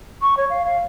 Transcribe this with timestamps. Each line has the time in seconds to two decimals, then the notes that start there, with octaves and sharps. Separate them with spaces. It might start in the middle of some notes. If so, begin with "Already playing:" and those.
0.22 C#6
0.37 C#5
0.50 F5
0.65 F5